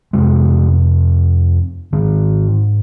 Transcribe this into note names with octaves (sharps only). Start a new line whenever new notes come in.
F2 C3 G#3
G#2 D#3